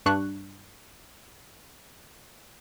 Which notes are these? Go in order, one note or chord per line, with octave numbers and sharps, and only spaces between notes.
G2 D4 C#6 F#6